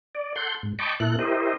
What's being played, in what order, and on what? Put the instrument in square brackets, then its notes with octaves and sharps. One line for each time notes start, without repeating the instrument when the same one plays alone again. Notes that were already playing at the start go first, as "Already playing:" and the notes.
[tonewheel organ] D5
A4 F#5 C6 G6
G#2
D#5 G5 A5 B5 C#6 D6
A#2 E4 A4 F#6
E4 G4 A#4 C5 D#5